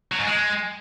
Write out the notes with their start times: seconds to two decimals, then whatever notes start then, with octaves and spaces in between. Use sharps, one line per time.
0.12 F#3
0.19 G#2
0.27 G#3